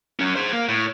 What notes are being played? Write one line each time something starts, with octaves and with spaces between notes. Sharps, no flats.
F#3 C#4
G#4 C5
A#3
A2